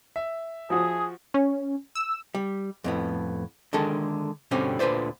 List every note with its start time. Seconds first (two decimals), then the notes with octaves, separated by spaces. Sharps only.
0.16 E5
0.70 F3 F#4 G#4 D#6
1.34 C#4
1.95 E6
2.35 G3
2.84 F2 A2 B3
3.73 D3 D#3 G#3 D4 A4 A#4
4.51 G2 B2 D3 G3 C4 C#4
4.79 D2 A#2 D3 B4 C5 D5